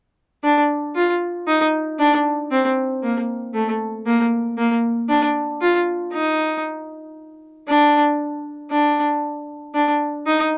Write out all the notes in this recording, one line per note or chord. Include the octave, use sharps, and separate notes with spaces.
D4
F4
D#4
D4
C4
A#3
A3
A#3
A#3
D4
F4
D#4
D4
D4
D4
D#4